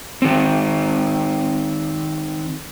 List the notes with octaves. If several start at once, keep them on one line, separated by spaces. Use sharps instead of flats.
D#3 C4